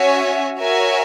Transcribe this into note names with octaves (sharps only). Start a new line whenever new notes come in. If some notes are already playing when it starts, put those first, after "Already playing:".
Already playing: C#4 F#4 C#5 E5 G#5
F#4 A#4 C#5 E5 G#5